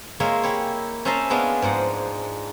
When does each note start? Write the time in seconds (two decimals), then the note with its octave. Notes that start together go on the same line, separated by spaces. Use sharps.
0.20 G#3 A#3 F4 C#5 E5
0.43 E4 G4 C#5
1.05 C#4 C5 E5 A5 A#5 C6
1.30 G#3 B3 C#4 D4 F4
1.62 G#2 F3 C5 F#5